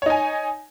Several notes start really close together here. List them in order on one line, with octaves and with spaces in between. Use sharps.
C#5 D#4 G#5